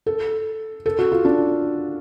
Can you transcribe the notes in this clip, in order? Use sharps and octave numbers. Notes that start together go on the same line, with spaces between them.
A4
A4
F#4
F4
D4